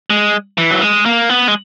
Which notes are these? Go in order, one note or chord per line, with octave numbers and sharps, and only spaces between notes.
G#3
E3
F#3
G#3
A#3
B3
G#3